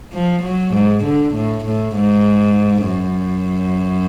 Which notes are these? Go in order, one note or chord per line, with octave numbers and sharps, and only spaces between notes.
F3
F#3
G#2
D3
A2
A2
G#2
F#2